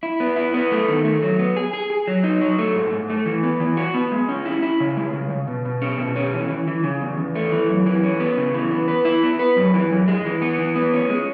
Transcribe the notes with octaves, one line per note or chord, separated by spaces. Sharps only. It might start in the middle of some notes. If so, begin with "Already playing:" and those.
E4
B3
E4
B3
A3
D#3
A3
F#3
B3
G#4
G#4
G#4
F#3
D#4
F#3
A3
G#2
G#2
A3
E3
B3
E3
F#4
B3
G#3
C#4
E4
E4
C#3
G#3
C#3
C#3
B2
B2
C#4
B2
C#4
E3
E3
E3
C#3
E2
E2
A3
E3
F#2
E3
C#4
B3
C#3
E3
B3
B4
E4
B3
B4
F#2
E3
F#2
G#3
E3
B3
E3
B3
C#4
G#3